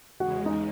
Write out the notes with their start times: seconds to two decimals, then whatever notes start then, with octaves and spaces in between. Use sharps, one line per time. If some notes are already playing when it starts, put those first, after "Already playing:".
0.20 E2 C#3 G#3 F#4 F#5
0.46 D#4 D#5